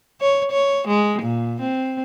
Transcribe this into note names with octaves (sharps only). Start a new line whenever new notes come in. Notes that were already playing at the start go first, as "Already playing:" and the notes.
C#5
C#5
G#3
A#2
C4